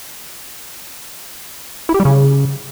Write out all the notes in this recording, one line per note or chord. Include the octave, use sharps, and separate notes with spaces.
E4
G4
G3
C#3